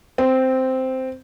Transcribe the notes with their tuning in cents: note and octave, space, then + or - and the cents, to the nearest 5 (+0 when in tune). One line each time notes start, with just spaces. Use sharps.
C4 -5